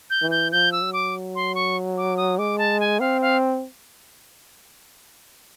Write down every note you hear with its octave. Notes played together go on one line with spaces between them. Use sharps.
G6
E3
G6
F3 G6
E6
F#3
D6
C6
C#6
D6
D#6
G#3 D6
A5
G#5
C4 F5
F5